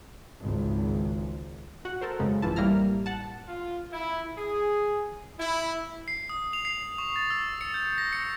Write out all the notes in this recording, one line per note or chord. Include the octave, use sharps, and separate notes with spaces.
G#1 C#2
F#4 F#5
A4 A#4 C5
F#2 C#3 G#3
A1 E3 F3 E4 A5
A1 G3 A#3 E4 A#5 F6
F#5 A5
F4
E4
G#4
E4
C7
D#6
F7
C7
C#6
A6
E6
C#7
G6
A#6
C#7